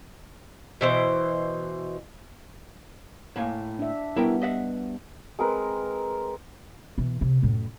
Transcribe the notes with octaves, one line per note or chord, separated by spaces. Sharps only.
B2 E3 C5
A2 A#3 G#5
D4 E5
G3 B3 E4 A#4 G5
D#5 E5 F#5
G#3 C4 A#4 B4
B2 E3
C3
F#2 A2